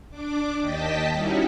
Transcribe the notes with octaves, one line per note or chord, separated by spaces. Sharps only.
D4 D6
D#2 D#5 G5 A5 B6
G3 C#4 D#4 E4 F#4